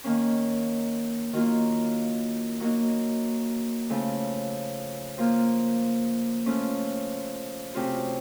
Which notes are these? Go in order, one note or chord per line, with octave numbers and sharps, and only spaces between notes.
D#3 A#3 C#4
D#3 F#3 A#3 F4
F#3 A#3 D#4 F#4
C#3 F3 A3
F3 A#3 F4
F3 A3 C#4 F4
C3 F#3 A3 C#4 F4